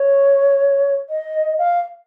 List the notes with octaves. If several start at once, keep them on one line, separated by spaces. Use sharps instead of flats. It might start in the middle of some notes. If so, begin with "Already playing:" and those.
Already playing: C#5
D#5
F5